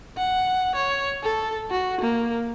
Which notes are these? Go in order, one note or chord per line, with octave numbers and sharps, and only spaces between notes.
F#5
C#5
A4
F#4
A#3